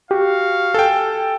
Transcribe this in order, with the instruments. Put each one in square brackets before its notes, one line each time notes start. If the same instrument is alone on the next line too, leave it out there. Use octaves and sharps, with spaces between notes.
[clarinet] F#4 [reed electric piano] G4 [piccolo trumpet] F5
[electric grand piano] A4 G5 [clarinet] G#5